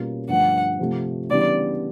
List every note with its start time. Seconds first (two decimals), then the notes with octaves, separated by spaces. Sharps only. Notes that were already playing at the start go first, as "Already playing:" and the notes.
Already playing: B2 G3 A#3 C#4 F4
0.28 G2 D3 F3 A3 F#5
0.79 C3 F3 A3
1.29 C#3 E3 G3 B3 D4 D5